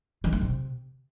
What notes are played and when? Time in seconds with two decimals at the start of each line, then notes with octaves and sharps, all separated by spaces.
0.24 E3
0.33 A3
0.41 C3